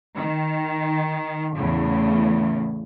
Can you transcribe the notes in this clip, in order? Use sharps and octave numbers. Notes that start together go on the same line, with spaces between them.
D#3
E2 A2 C#3